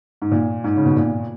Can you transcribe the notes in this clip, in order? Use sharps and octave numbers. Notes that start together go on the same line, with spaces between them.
G#2
A#2
G#2
C#3
B2
A#2